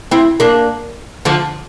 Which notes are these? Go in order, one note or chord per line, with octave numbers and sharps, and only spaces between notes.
C4 E4
A#3 D4
D3 F3